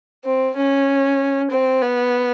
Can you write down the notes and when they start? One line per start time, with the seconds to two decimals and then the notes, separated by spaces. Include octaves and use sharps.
0.25 C4
0.56 C#4
1.50 C4
1.82 B3